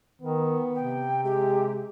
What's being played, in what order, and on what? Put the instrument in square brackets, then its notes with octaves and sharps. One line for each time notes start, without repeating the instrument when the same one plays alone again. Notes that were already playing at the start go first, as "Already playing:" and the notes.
[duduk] D#3 [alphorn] B3
[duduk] C3 [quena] G5
[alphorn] G#3 [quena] G4